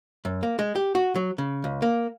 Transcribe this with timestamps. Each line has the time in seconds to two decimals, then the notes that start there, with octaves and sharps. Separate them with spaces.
0.25 F#2
0.43 A#3
0.59 G#3
0.76 G4
0.95 F#4
1.15 F#3
1.38 C#3
1.64 C#2
1.82 A#3